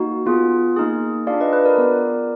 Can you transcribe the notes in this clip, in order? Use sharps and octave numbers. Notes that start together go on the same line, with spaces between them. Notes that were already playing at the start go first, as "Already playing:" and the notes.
Already playing: A#3 D#4 F#4
B3 F4 G#4
A#3 D#4 G#4
D4 F4 G#4 D5 F5
B4 D#5
B4
A#4 D5
B3 F4 G#4